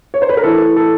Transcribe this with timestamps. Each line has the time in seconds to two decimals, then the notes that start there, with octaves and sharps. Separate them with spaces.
0.14 C#5
0.22 C5
0.29 B4
0.37 A#4
0.44 E3 A4
0.76 A4